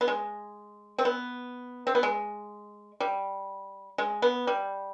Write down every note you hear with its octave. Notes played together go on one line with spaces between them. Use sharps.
B3
G#3
C4
B3
C4
B3
G#3
G3
G#3
B3
G3